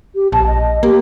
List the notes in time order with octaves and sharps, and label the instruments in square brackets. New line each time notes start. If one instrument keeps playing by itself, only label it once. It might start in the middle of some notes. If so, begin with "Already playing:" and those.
[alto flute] G4
[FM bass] A#1 [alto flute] A5
[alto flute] D#5
[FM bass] A#3 [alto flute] G4